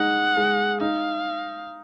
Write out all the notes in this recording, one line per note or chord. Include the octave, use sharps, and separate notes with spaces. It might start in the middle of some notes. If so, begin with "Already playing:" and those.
Already playing: G#3 D#4 F#5
G#3
D#4 F5